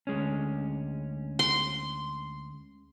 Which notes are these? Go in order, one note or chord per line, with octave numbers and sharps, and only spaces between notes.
D2 G#3 C#4
C6